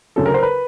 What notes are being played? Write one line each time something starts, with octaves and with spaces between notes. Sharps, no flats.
D2 C#3 F#3 A4
A#4
C5
A#4
B4